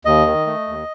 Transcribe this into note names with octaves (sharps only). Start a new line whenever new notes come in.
D#2 D#5
D#3
A3
D#2